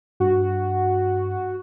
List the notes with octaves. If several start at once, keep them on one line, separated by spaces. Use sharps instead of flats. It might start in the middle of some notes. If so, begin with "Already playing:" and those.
G2 F#4